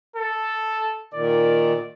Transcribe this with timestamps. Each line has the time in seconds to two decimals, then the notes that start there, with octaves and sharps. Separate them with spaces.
0.16 A4
1.14 A#2 D#3 D5